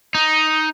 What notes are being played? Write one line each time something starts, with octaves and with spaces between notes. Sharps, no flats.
D#4